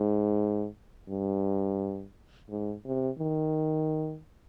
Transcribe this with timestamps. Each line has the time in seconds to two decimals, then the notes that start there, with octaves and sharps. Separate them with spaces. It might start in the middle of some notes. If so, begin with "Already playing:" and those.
Already playing: G#2
1.09 G2
2.50 G#2
2.85 C3
3.19 D#3